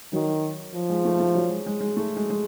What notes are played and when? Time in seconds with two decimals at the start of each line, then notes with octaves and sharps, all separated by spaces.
0.13 D#3 F#3
0.74 F3
0.90 G#3
1.05 A3
1.20 A3
1.35 F#3
1.50 G#3
1.66 G#3
1.80 G#3
1.97 A3
2.17 G#3
2.30 G#3